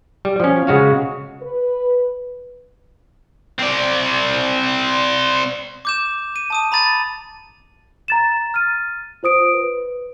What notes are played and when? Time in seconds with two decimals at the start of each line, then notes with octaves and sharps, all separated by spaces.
0.25 G3
0.40 F3 C#4
0.67 C#3 G#3 F#4 F5
1.42 B4
3.59 C4 D5
5.85 D6 G6 E7
6.36 D#7
6.50 A5 D#6 D#7
6.72 A#5 B5 A6 D#7
8.08 A#5 A6 E7
8.54 F6 A6 D#7
9.23 F4 C5 D#6 D7
9.54 B4